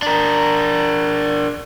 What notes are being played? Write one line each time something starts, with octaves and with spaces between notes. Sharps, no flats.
D4 A#4